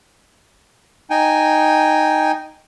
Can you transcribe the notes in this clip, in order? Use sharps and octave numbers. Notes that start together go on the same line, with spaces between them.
D#4 G5 G#5